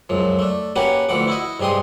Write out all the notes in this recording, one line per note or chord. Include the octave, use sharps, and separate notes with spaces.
C#2 F#2 F3
A3 D4
A#3 C#4 F#4 G4 B4 F#5
D2 E3 F3 F#5 D6
E4 F#4 D#5
G2 C3 G#3 G4 C6 D#6